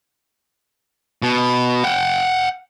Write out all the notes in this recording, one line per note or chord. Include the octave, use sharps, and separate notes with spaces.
B2
F#5 G5